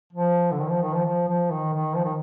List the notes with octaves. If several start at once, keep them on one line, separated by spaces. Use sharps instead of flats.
F3
D3
D#3
F3
D#3
F3
F3
F3
D#3
D#3
F3
D#3